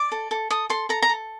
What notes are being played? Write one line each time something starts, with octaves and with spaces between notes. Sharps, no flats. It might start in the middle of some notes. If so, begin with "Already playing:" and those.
Already playing: D5 D6
A4
A4
A4 D#6
A4 C6
A4 A#5
A#5
A4